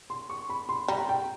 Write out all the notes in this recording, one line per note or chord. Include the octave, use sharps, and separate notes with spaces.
C6
C#6
B5
C6
G3 A#5
G5